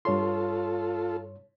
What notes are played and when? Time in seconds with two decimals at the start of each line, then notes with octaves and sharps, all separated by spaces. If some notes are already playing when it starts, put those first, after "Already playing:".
0.05 G2 F4 A4 C#5 C6